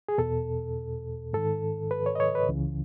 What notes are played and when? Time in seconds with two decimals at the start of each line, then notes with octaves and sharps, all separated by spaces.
0.09 G#4
0.18 E2 B2 A4
1.33 G#2 D#3 A4
1.91 B4
2.06 C#5
2.15 D#5
2.20 C#5
2.35 B4
2.49 C#2 C#3 E3